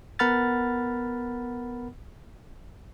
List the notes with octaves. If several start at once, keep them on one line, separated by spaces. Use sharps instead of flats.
B3 A#4 F#5 B5 F6 A6